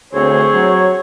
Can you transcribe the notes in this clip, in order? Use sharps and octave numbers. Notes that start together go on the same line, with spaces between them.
D2 C4 G#4 C#5
F#3